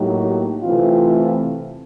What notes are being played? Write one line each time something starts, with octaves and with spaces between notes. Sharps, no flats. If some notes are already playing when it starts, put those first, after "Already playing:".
Already playing: A2 F#3 A#3 D#4 G4
C3 E3 A3 C4 F4